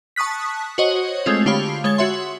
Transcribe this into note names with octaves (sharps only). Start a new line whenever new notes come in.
A5 C#6 D#6 F#6 B6
F#4 C5 C#5 D#5
G#3 A3 C4 F4
D3 F4 G4 C#5 F5 B5
G#3 C#5 G#6 A6
F#4 C#5 E5 C6